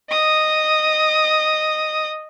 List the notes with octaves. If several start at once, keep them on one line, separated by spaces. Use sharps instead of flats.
D#5 D#6